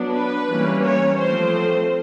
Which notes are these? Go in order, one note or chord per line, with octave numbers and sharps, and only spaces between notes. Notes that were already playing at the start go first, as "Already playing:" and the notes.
Already playing: F#3 B3 D4
B4
E3 G3 A#3 C#4
C#5
F3 A3 C4 C5